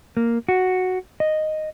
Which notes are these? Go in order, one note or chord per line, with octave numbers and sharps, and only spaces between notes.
A#3
F#4
D#5